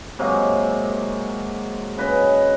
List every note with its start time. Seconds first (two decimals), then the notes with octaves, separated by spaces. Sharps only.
0.19 C3 F#3 G#3 A#3
1.97 C#3 B4 D#5